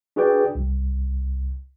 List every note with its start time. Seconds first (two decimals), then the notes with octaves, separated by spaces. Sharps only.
0.16 D4 F#4 G#4 B4 D5 G5
0.55 C2